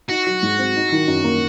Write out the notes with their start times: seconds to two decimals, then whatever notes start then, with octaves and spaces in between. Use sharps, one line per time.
0.10 D#4 F#4
0.27 F#3
0.43 G#2
0.59 C4
0.76 D#4
0.92 D#3
1.08 F#2
1.24 A#3